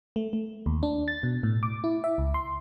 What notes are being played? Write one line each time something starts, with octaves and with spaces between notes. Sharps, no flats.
A3
A3
D#2
D4
A6
B2
A2
D6
E4
E5
C#2
C6